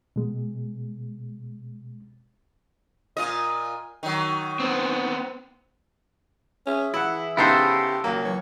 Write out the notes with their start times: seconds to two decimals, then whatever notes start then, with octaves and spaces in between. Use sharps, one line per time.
0.16 B2 G#3
3.17 A#2 F4 D#5
4.03 D#3 F#3
4.60 B3 C4
6.66 C#4 G#4 E5
6.94 E3 E4 F#5
7.37 C#3 B3 D#4 E4 G4 A4 C5
8.04 C#2 F#3 A#3
8.25 E3 F#3 C#5